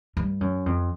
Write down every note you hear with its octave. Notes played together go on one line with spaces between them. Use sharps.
G2
F#2
F2